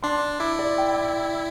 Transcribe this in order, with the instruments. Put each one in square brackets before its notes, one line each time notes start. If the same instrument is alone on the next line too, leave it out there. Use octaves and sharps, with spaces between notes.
[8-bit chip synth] D4 [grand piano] C6
[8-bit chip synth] E4 [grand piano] D6
[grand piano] D5
G5